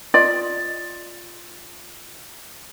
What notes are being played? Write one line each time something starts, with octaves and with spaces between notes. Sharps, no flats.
F4 D5 D#5